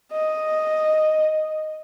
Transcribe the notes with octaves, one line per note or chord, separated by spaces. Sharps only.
D#5